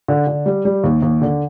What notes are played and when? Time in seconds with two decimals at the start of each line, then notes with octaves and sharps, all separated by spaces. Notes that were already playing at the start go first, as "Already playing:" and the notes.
0.08 D3
0.27 D3
0.46 G3
0.65 G3
0.84 D#2
1.02 D#2
1.22 D3